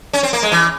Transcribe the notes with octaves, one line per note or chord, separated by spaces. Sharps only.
C#4
C4
A#3
G#3
E3